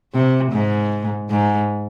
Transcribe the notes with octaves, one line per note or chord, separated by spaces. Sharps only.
C3
G#2
G#2